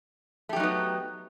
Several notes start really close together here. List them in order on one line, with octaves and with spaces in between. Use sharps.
A3 G4 F#3 D#4 B3